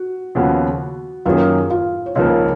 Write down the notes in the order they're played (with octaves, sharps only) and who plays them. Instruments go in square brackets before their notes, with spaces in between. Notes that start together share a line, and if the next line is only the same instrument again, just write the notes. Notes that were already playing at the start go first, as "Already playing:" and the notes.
Already playing: [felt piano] F#4
[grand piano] D#2 C#3 F3 B3 F#4
[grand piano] F#2 D#3 A#3 C#4 G#4 [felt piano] F4 F5
[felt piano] F4 F5
C#5
[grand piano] C#2 C#3 F3 A#3 [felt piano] D#4 D#5